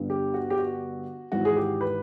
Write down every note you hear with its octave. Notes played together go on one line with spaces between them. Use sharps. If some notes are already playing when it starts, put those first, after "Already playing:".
Already playing: G1 G2 D3
G4
F#4
G4
F#4
G#1 G#2 E3 F#4
G#4
G4
B4